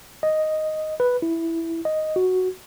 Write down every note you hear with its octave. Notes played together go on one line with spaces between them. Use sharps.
D#5
B4
E4
D#5
F#4